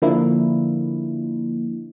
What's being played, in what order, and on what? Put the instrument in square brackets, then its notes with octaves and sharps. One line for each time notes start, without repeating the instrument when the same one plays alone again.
[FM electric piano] D3 F3 A#3 D4 E4